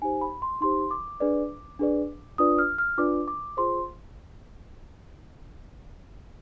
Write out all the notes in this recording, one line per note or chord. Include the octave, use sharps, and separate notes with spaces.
D#4 G4 C5 G#5
B5
C6
D#4 G4 C5 C6
D6
D4 G#4 B4 D5
D4 G#4 B4 D5
D4 F4 B4 D5 D#6
F6
F6
D4 F4 B4 D5 D6
D6
F4 G#4 C5 C6